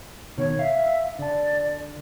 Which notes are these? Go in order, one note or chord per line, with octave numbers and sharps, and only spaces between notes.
B2 D#3 C#5
E5 F5
D3 D5 A5